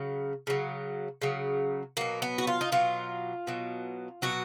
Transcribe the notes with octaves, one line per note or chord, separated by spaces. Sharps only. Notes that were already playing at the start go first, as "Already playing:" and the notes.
Already playing: C#3 F#3
C#3 F#3
C#3 F#3
B2 F#3 A#3
B3
F#4
F4
D#4
B2 F#3 F4
B2 F#3
B2 F#3 F#4